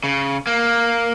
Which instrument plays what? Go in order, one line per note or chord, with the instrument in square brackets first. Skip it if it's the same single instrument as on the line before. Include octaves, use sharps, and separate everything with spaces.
[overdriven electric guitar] C#3
A#3